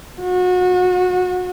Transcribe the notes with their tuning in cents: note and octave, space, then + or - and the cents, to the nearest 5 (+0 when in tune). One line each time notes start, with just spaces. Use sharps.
F#4 -30